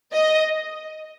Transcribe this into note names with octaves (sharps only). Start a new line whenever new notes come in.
D#5